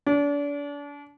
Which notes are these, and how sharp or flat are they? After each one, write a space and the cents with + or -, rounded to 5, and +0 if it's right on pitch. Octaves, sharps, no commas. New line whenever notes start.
D4 -35